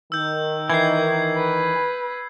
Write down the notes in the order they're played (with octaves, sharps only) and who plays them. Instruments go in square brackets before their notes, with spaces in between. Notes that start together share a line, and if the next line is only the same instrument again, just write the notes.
[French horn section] D#3 [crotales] E6 G6
[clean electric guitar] E3 [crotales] G#6 C7
[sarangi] B4